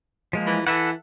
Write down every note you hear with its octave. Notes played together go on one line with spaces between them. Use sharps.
F3 G#3 A#3
E3
E3 A4 E5 F#5